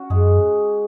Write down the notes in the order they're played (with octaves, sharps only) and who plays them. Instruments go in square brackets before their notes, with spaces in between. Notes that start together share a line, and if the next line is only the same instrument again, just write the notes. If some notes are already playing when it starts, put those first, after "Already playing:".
Already playing: [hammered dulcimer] C#4 F#4
[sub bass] F#2 [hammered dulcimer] G#3 G#4